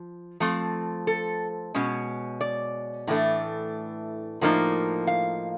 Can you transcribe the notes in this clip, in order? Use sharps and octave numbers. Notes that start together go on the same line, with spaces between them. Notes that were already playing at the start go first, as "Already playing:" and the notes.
Already playing: F3
F3 A3 C4
A4
B2 G#3 C#4
D5
A2 E3 A3 D4
A2 F3 A#3 D#4
F5